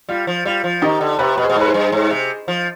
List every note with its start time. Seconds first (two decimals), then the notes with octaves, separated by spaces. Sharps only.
0.09 G3 F4
0.27 F3
0.45 G3 F4
0.64 F3
0.82 D#3 D#4 G4
1.01 D3
1.19 C3 G4 B4
1.36 B2 B4
1.43 G#4 C5
1.50 B2
1.56 G#2
1.61 B4
1.68 G#4 C5
1.74 G2
1.92 G#2
2.11 C3
2.48 F3